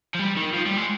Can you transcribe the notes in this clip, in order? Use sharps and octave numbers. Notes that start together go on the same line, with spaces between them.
F3
G3
D#3
F3
G3
G#3